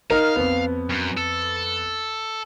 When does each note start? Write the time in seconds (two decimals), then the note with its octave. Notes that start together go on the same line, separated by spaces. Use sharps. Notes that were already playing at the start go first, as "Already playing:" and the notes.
0.10 D#4 A#4 F5
0.36 F2 B3
0.90 F#2
1.17 A4